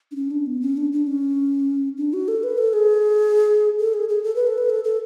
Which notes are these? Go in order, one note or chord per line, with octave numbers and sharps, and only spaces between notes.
D4
C#4
D4
B3
C#4
D4
D4
C#4
D4
F#4
A4
B4
A4
G#4
A4
G#4
G#4
A4
B4
A4
B4
A4
A4